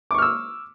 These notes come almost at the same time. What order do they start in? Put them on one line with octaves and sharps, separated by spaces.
D6 C#6 F6 E6